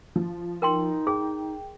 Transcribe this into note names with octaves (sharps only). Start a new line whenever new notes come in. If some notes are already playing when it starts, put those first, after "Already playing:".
F3
D#4 A#4 G5 C6
G#4 G5